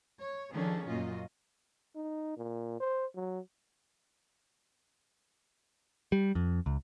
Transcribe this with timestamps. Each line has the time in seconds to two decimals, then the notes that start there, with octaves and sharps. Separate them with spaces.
0.20 C#5
0.52 D#3 F3 C#4 D4 G#4 A4
0.88 F#2 A#2 F4 F#4 D#5
1.96 D#4
2.37 A#2
2.80 C5
3.15 F#3
6.12 G3
6.35 F2
6.66 C#2